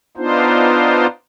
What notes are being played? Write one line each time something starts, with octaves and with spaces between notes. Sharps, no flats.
B3 D4 D#4 F4 C5